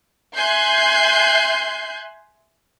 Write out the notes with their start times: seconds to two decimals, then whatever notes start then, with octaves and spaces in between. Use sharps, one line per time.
0.36 E5 G#5 C6 F#6 G6 C7